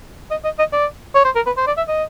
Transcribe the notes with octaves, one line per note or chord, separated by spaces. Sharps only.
D#5
D#5
D#5
D5
C#5
C5
A#4
B4
C5
D5
E5
D#5